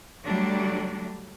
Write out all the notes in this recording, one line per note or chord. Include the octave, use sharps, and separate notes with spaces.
D3 F#3 G3 A3 D4